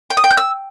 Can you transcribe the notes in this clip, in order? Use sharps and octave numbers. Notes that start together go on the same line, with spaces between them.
G5
D#6
G5
G6
E6